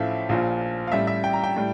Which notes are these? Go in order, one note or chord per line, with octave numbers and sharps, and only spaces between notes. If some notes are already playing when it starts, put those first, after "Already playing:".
Already playing: A1 A2 F3 A3 E4 E5 F5
A#1 A#2 F3 F5
F5
A1 A2 G3 E5
E5
G5
A#5
G5
A2 G3